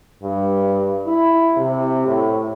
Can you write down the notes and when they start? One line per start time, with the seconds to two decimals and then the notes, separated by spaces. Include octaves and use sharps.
0.23 G2
1.07 E4
1.57 C3
2.07 A2